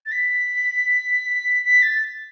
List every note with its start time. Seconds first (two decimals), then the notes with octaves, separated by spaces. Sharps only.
0.06 A6
0.12 B6
1.64 B6
1.82 A6